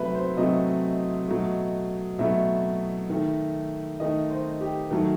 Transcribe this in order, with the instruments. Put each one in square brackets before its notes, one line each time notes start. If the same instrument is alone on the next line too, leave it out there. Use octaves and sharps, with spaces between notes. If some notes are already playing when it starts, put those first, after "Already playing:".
Already playing: [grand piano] C3 F#3 A3 B4 E5
C5
C3 F#3 A3 D#5
B2 F#3 A3
B2 F#3 A3 E5
D#3 A3
D#3 A3 D#5
C5
G4
D#3 F#3 A3 A4